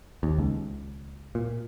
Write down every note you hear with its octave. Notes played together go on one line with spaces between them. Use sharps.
D#2
C#2
A#2